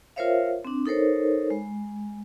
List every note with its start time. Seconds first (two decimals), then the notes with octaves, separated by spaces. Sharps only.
0.16 F4 A#4 C5 C#5 E5 F5
0.65 C4 D4
0.86 D#4 A4 A#4 C5 C#5
1.50 G#3